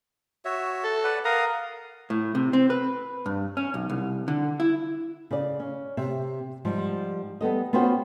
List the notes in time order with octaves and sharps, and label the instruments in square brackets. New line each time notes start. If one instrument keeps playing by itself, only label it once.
[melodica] F#4 C#5 E5
[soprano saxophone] A4
[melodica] B4 D5 F#5
[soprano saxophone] A#4 [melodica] F5 F#5 D#6
[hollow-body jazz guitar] A2
C3
C4
B4
G2
C#4
B1
C2
D3
E4
[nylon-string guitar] C#3 D5
C#4
C3 E5
G#2 F3 G3
G3 B3 A4 D#5
B3 C#4 F4 F#4 C5 G5